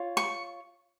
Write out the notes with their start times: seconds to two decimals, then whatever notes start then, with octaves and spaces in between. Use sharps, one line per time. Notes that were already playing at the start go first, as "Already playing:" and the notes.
Already playing: F4 C#5
0.17 C#6